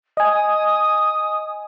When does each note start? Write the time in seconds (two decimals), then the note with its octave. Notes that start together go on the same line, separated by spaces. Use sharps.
0.17 D#5 G#5 D#6